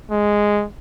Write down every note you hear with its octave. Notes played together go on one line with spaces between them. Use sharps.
G#3